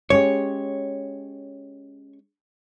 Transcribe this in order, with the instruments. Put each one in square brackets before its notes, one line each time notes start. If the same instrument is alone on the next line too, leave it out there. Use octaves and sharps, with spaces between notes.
[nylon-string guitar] G#3 C#4 G4 [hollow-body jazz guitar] C#5